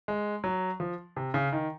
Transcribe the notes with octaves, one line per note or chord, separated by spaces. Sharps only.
G#3
F#3
F3
C3
C#3
D#3